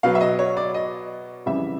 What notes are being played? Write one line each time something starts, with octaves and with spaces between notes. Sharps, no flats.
B2 F#3 B3 F5
E5
D#5
C#5
D5
D#5
F2 C#3 E3 G3 E5